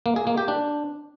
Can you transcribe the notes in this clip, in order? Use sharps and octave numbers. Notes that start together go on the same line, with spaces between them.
A#3
G#4
A#3
G4
D4